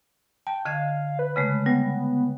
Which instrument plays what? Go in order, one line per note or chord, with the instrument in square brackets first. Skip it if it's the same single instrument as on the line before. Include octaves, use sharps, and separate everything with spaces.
[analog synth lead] G5 [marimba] A5
[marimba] D3 D#5 G#6 [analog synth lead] F5
[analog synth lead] B4
[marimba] C#3 G#3 A3
[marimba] G3 [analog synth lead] B3